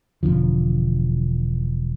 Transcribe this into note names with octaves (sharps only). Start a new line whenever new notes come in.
E1 C2 D3 F3